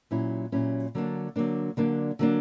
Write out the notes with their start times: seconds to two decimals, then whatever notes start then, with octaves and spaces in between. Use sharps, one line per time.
0.11 A#2 F#3 C#4 E4
0.52 A#2 F#3 C#4 E4
0.95 D3 F#3 A#3 D4
1.36 D3 F#3 A#3 D4
1.77 D3 F#3 A#3 D4
2.19 D3 F#3 A#3 D4